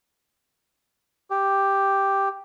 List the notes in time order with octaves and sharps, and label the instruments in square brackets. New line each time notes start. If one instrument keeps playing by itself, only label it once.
[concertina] G4